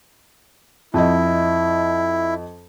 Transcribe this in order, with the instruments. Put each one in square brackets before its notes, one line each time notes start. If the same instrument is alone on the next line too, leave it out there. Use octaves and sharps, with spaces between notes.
[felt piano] F2 D#5 [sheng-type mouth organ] E4